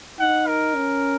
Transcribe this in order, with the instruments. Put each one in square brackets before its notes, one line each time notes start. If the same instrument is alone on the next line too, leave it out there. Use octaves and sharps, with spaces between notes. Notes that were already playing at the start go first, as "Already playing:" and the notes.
[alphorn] D#4 [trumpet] F#5
[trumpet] A#4
[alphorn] C#4